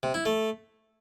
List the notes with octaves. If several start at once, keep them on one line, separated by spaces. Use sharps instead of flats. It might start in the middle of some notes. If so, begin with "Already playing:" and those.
C3
E4
A3